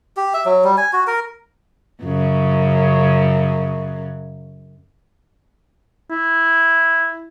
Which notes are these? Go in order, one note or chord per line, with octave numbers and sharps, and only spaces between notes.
G4
E5
F#3
G3
G#5
F#4
A#4
F#2 C#3
E4